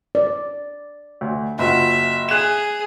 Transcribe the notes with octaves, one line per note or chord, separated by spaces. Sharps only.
D5
D2
F#1 F4 F#4 E5
G#4 F#6 E7